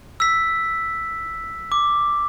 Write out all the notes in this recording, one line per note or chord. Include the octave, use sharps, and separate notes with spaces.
E6 B6
D6